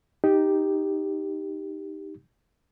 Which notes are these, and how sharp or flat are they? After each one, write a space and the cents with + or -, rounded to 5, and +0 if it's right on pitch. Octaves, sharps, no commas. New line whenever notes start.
D#4 +0 G4 +0